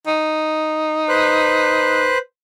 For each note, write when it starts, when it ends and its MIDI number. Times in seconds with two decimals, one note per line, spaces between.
0.07 2.11 63
1.09 2.18 71
1.09 2.18 72
1.09 2.18 90